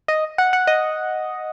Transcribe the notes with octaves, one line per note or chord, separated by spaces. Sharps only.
D#5
F#5
F#5
D#5